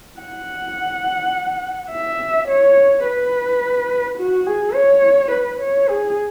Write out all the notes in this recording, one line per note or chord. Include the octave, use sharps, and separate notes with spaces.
F#5
E5
C#5
B4
F#4
G#4
C#5
B4
C#5
G#4